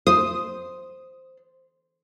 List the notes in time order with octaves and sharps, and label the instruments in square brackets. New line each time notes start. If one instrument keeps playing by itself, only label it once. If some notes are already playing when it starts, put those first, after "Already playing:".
[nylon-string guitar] C5 [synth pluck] D#6